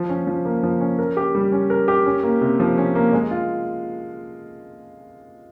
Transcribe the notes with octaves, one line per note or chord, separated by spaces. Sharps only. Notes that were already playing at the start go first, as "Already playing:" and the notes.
Already playing: F3
C#4
F3
A#3
F3
C#4
A#4
G4
G3
C#4
A#4
G4
C#4
A#3
C3
F3
C#4
A#3
G#3
F4